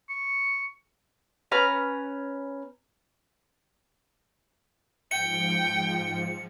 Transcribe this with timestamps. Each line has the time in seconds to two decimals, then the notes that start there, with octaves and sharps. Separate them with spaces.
0.09 C#6
1.52 C#4 B4 A#5 F6
5.11 G#2 F3 G5 C#7